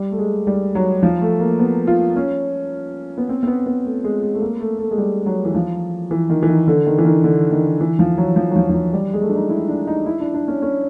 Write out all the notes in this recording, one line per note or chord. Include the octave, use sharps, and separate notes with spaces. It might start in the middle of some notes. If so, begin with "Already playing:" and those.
Already playing: G3
A3
G#3
G3
F#3
F3
A3
A#3
B3
F4
C#4
B3
C4
C4
B3
B3
A3
G#3
G#3
A3
A#3
A3
A3
G#3
G3
F#3
E3
F3
E3
D#3
E3
D#3
D3
D#3
E3
D#3
D3
D#3
E3
F3
F#3
F3
F#3
F3
F3
F#3
G3
G#3
A3
D4
D#4
E4
D4
D#4
E4
D4
D4
C#4
C#4